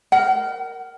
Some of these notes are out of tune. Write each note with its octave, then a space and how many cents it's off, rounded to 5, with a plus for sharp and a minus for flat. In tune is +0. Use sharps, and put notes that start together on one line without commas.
A#4 +0 F#5 +40